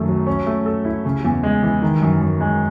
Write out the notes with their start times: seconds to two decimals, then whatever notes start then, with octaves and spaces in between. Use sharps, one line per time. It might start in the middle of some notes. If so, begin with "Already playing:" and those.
Already playing: F#2 D#3 A3
0.08 F#3
0.27 C#4
0.46 A3
0.66 A4
0.85 E4
1.05 C#3
1.25 E2
1.43 G#3
1.63 E3
1.82 D#3
2.02 F#2
2.21 F#2
2.41 G#3